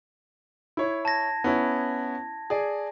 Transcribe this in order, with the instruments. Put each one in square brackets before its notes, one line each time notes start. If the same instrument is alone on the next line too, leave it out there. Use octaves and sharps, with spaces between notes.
[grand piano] E4 C#5
[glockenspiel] A5 G#6 A#6
[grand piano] B3 C#4 E4
G#4 D5